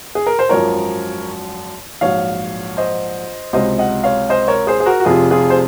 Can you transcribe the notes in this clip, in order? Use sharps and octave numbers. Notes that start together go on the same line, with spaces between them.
G#4
A#4
C5
G#1 F#2 F3 A#4 C#5
A#1 G#2 F#3 C#5 F5
C5 D#5
C#2 C3 F#3 C5 D#5
D#5 F#5
C#5 F5
C5 D#5
A#4 C#5
G#4 C5
G#4
F#4 A#4
F#4
F1 F2 C3 F4 G#4
F4 G#4
C5